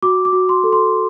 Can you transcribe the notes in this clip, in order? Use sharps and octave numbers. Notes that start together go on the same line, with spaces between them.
F#4 D6
D6
F#4
C6
A4
C6